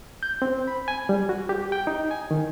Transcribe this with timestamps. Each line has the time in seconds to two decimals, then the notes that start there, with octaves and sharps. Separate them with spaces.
0.23 G6
0.42 C4
0.67 B5
0.88 G#5
1.09 G3
1.29 F#4
1.49 G4
1.72 G5
1.87 D#4
2.11 G#5
2.31 D#3